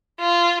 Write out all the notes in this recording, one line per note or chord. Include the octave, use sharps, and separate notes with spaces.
F4